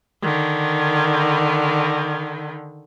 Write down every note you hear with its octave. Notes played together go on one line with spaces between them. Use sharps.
D3 D#3